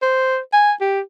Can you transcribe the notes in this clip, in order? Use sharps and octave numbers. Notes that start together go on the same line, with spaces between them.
C5
G#5
G4